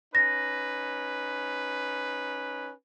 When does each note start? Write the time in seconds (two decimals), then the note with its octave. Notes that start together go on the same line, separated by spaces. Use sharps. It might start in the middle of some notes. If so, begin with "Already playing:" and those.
0.15 C#4 D#4 B4 A#6